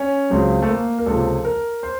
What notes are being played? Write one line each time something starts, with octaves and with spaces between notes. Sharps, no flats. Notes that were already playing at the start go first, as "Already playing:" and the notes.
Already playing: C#4
C#2 C#3 F#3 C4
A3
A#3
A#4
C#2 C3 F3 A4
A#4
C5